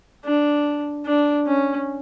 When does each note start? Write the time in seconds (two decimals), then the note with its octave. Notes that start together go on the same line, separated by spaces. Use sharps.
0.25 D4
1.06 D4
1.47 C#4